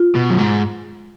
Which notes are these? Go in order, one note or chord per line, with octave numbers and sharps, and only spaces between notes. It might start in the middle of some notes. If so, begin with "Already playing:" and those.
Already playing: F4
B2
F#2
G#2